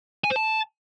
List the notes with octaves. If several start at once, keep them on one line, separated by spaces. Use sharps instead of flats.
G#5
C5
A5